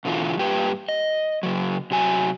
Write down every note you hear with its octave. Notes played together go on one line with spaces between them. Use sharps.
B2 D3 E3 F4
G2 A#2 G4 B4
D#5
C#3 F#3
C3 F#3 G#5